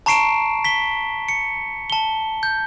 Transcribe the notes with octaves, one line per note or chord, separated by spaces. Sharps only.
A5 A#5 C#6 C7 D7 E7
B6 G7
C#7
A5 G7
G6